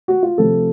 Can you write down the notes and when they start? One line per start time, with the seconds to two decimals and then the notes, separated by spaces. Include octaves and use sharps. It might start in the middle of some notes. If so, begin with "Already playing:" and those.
0.08 F#4
0.23 F4
0.38 C3 F3 A3 A4